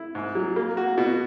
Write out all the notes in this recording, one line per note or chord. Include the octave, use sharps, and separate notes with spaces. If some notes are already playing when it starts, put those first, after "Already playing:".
Already playing: E4
G#2
F#3
A#3
F#4
B2